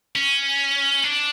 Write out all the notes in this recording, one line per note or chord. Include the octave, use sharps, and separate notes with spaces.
C#4
D4